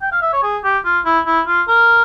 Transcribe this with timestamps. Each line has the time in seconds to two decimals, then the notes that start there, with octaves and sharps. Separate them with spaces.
0.02 G5
0.12 F5
0.22 E5
0.33 C#5
0.43 G#4
0.64 G4
0.85 F4
1.05 E4
1.26 E4
1.47 F4
1.68 A#4